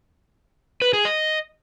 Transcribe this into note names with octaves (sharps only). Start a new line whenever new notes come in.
B4
G#4
D#5